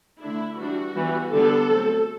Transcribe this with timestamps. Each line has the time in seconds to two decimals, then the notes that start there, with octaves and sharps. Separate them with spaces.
0.20 D3 A3 D4 E4
0.57 E3 G3 D4 F#4
0.95 E3 G3 B3
1.32 D3 G3 B3 D4 A4
1.69 F#3 A3 C4